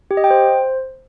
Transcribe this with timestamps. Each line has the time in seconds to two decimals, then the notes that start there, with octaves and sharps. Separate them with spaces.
0.11 G4
0.17 D#5
0.24 G5
0.31 C5